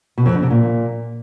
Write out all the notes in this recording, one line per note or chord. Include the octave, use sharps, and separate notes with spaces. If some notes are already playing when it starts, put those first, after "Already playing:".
B2
F2
D3
C3
A#2